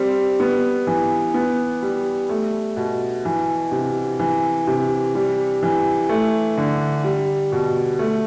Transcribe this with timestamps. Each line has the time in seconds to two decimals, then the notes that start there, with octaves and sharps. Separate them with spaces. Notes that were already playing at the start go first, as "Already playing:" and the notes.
Already playing: G3 C4
0.40 B3
0.87 E3
1.34 B3
1.82 G3
2.29 A3
2.77 B2
3.25 E3
3.72 C3
4.19 E3
4.67 C3
5.15 G3
5.63 E3
6.09 A3
6.58 D3
7.04 G3
7.52 B2
7.99 A3